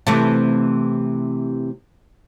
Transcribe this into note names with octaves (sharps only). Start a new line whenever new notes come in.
C3 E3 A3